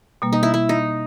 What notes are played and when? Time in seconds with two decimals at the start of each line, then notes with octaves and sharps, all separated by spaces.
0.22 B2 G3 A#3
0.33 D#4
0.43 E4
0.54 E4
0.69 D#4